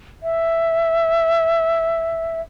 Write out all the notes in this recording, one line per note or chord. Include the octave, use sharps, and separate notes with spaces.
E5